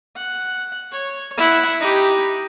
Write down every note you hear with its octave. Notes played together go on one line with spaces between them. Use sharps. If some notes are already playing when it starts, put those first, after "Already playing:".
F#5
C#5
E4 F#5
D#4 G4